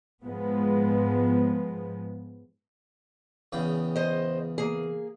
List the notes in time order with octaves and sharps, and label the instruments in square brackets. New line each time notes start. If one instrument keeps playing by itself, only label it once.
[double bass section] G#2 F3 G#3 B3
[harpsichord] E2 C#3 G5
[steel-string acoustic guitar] C5 D#5
A#3 G#4